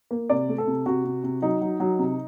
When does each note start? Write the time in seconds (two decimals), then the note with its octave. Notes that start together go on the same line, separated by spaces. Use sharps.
0.11 A#3
0.30 C3 D5
0.49 A3
0.58 A4
0.67 C3
0.86 C3 F#4
1.04 C3
1.24 C3
1.42 F#3 D#4
1.61 F#3
1.80 F#3
1.99 C3